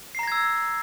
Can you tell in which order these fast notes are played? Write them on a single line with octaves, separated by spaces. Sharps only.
C7 A#5 A#6 G#6 E6